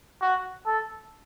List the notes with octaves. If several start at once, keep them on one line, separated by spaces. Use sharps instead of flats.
F#4
A4